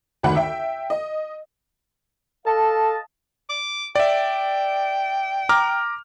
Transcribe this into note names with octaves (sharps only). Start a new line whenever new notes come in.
G#1 D2 D#3 F#5 B5
E5 G5
D#5
A4 D#5 F5 A5
D6
D5 E5 G5
A#5 D6 F6